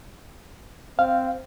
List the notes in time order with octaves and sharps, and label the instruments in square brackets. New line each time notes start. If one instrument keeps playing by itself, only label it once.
[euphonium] C4 [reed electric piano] F5